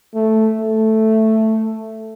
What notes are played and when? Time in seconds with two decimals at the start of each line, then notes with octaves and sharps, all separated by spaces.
0.14 A3
0.60 A3